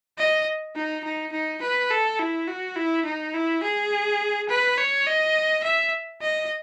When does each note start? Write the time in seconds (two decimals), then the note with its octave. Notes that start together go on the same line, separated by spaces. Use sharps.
0.18 D#5
0.76 D#4
1.04 D#4
1.32 D#4
1.62 B4
1.91 A4
2.19 E4
2.48 F#4
2.76 E4
3.05 D#4
3.34 E4
3.64 G#4
4.49 B4
4.78 C#5
5.07 D#5
5.64 E5
6.22 D#5